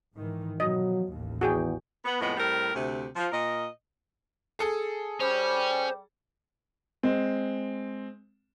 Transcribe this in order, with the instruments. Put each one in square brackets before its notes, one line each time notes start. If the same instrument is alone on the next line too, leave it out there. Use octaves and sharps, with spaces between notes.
[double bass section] G#2 D#3 E3
[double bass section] B2 F3 [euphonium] F#3 [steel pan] D#5
[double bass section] A1 D#2
[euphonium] E2 [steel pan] F#4 G#4 G5
[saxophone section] B3
F2 A2 G#3 B3
A2 G3 C4 A#4
D2 C3
F3
A#2 A#4 D#5
[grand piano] G#4 A4 G#5
[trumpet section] G3 [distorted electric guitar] C#4 [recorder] C5
[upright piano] G#3 C4